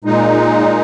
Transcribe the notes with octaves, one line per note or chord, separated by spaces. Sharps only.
A#2 G#3 D#4